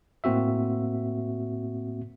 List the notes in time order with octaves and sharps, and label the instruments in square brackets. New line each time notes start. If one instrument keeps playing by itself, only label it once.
[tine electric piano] A2 A#3 C4 F#4 E5